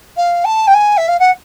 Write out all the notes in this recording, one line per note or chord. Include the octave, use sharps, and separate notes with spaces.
F5
A5
G5
G#5
E5
F5
F#5